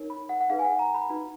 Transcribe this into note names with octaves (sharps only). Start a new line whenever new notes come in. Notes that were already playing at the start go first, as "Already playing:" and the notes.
Already playing: D#4 A#4 C#5
B5
F#5
F#5
D#4 G#4 B4 F5
G#5
F#5
A#5
B5
D#4 F#4 B4 B5